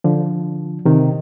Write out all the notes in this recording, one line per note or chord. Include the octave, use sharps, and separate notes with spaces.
D3 F3
C3 D#3